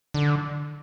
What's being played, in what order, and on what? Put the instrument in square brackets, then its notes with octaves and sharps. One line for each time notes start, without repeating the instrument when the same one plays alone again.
[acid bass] D3